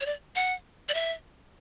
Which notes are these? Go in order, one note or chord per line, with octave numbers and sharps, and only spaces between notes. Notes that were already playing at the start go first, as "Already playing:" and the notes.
C#5
D5
F#5
D5
E5